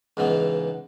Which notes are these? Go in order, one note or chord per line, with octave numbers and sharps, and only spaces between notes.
C#2 G#2 E3 B3